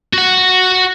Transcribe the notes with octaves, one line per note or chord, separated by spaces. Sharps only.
F#4 F#5